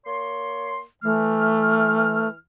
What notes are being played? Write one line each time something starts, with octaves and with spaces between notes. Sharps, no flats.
A#3 C#5 C6
E3 A3 F6